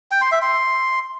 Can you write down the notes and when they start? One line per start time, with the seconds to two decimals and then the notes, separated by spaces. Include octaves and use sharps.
0.11 G5
0.22 C6
0.32 E5
0.42 C6